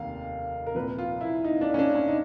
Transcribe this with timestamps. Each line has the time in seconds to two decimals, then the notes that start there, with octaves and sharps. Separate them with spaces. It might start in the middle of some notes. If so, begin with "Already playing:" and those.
Already playing: F1 D#2 D#3 F5
0.67 A#4
0.75 C2 A#2 F3 B4
0.98 F4
1.21 E4
1.44 D#4
1.61 D4
1.74 C#4
1.79 D4
1.95 C#4
2.08 D#4